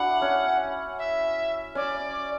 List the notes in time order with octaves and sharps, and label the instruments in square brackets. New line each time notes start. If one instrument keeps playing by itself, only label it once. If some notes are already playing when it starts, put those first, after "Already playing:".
Already playing: [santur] D4 E4 F#4 [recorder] F#5
[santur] C#4
[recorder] E5
[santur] C#4 [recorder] D5